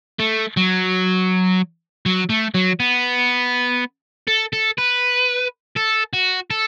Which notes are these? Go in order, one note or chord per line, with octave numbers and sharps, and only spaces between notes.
A3
F#3
F#3
A3
F#3
B3
A4
A4
B4
A4
F#4
A4